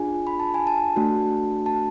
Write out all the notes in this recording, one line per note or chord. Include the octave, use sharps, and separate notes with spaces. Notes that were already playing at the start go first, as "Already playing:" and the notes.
Already playing: D4 F4 G#4 G#5
B5
A5
G#5
A5
A3 D4 F#4
A5